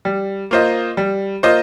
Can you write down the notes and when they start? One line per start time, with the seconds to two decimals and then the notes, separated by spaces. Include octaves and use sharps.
0.05 G3
0.51 A#3 F4 C5 D#5
0.97 G3
1.43 A#3 F4 C5 D#5